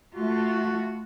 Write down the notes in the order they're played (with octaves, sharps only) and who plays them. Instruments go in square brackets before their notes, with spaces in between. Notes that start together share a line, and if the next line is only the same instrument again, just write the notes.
[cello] A3 F4 [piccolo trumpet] F#4